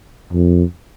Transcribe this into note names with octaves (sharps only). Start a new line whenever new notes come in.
F2